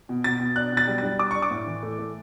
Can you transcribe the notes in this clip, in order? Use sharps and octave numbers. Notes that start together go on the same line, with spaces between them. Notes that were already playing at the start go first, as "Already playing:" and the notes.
B2
B2 A6
B2
D4 F#6
B2
A6
G3
G3 A6
D4 D6
D4 C#6
D6
A2
E3
A3
A3